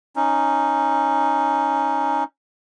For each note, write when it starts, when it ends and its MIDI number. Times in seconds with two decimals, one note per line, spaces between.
0.16 2.24 61
0.16 2.24 63